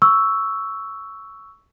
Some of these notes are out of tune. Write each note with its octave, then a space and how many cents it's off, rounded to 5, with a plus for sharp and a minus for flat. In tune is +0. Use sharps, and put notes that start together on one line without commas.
C#6 +10 E6 +0